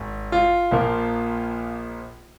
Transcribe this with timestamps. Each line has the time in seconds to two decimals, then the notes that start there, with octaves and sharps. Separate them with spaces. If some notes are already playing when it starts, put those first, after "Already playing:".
Already playing: G#1
0.32 F4
0.71 A#1 A#2 F3 A#3